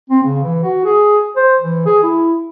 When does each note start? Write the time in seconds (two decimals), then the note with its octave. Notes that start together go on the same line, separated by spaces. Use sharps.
0.10 C4
0.23 C#3
0.43 E3
0.63 F#4
0.85 G#4
1.36 C5
1.60 E3
1.86 G#4
2.03 E4